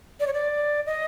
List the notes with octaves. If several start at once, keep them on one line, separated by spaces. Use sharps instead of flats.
D5
C#5
D5
D#5